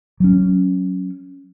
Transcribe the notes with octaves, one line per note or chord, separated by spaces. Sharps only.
F#3 C#4